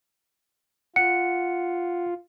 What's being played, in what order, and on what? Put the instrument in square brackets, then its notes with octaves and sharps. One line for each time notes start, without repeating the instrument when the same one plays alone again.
[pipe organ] F4 [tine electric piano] F#5 [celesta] C#7